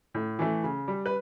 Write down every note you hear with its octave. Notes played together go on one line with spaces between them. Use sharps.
A2
E3 A3
C#3
G3
B4